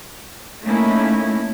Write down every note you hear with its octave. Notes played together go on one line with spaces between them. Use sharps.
A3 A#3 C#4 D#4 E4